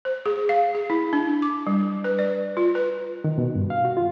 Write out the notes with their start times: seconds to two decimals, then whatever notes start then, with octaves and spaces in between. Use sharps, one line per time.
0.05 C5
0.26 G#4
0.49 F5
0.75 G#4
0.90 E4
1.13 D4
1.42 D6
1.67 G3
2.04 B4
2.19 D5
2.57 F4
2.75 B4
3.24 D#3
3.38 B2
3.55 G2
3.70 F5
3.85 F#4
3.97 F4